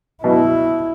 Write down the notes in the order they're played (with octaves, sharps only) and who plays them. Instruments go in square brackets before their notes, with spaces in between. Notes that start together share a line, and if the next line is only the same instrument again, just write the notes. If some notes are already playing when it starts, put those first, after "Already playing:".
[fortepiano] B2 [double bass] E4